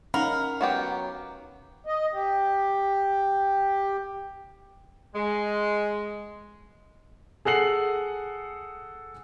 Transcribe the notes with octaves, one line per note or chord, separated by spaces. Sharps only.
C#4 D#4 A#4 F5 F#5 B5
F#3 B3 G4
D#5
G4
G#3
G#4 A4 F#5 C7 F#7